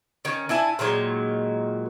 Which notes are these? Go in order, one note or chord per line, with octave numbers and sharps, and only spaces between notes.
D#3 C#4
D4 E4 G#5 A5
A#2 D#3 F#3 G#3